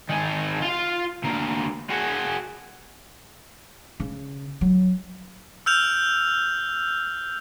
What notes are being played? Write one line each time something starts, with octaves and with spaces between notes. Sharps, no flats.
D#3 G#4
F4 F5
D2 A#3
F#4 G#4
C#3
F#3
E6 F6 G6 F7